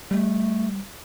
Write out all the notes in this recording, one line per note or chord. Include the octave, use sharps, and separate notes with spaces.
G3 A3